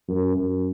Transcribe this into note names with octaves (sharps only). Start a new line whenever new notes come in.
F#2
F#2